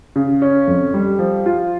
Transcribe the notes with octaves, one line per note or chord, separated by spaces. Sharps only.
C#3
C#4
F2
G3
F3
F4